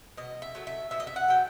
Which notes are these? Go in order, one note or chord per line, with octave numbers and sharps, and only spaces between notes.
B2 D#5
E5
F#3 A3
E5
B2 E5
D#5
E5
F#5
F#3 A3 G5